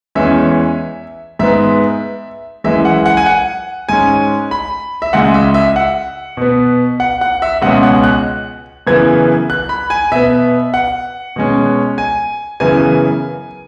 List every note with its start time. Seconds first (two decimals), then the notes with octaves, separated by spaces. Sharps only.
0.15 E2 E3 G#3 C#4 E5
1.39 G#2 G#3 B3 E5
2.64 F#2 E3 G#3 E5
2.85 F#5
3.06 F#5
3.17 G#5
3.26 F#5
3.89 G#2 G#3 C#4 G#5
4.51 B5
5.02 E5
5.13 C#2 C#3 G#3 F#5
5.34 E5
5.54 E5
5.76 F#5
6.37 B2 B3
7.00 F#5
7.21 F#5
7.42 E5
7.62 C#2 B2 G#3 C#4 F#5
7.83 F#5
8.04 F#6
8.87 F#2 C#3 E3 B3 G#6
9.50 F#6
9.69 B5
9.90 G#5
10.12 B2 B3 E5
10.74 F#5
11.36 B2 G#3 C#4
11.98 G#5
12.60 F#2 C#3 E3 B3 G#5